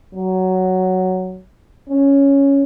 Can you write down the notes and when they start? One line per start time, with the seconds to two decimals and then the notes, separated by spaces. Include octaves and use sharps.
0.15 F#3
1.89 C#4